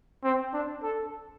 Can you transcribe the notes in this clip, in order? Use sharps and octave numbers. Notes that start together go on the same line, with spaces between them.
C4
D4
A4